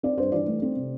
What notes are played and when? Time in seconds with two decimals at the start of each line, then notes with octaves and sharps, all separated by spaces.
0.03 C4 D5
0.18 G2 C5
0.32 E3 D5
0.47 A3
0.62 C4
0.76 C3